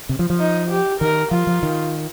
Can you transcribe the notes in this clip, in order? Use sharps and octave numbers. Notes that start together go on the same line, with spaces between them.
C3
F3
F3
D#4
G4
D#3 A#4
F3 F4
F3
D#3